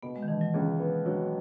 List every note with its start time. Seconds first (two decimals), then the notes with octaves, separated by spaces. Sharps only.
0.03 B2 B3
0.16 G#3
0.23 D#3
0.28 B2 E3
0.41 F#3
0.54 C#2 E3
0.80 B3
1.06 F#3